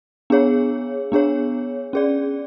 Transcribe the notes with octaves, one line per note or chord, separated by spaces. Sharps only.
B3 D4 G#4 C#5
B3 D4 G#4 C#5
C#4 G#4 D5